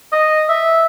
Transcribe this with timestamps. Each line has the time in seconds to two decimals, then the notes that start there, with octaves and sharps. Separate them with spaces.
0.12 D#5
0.49 E5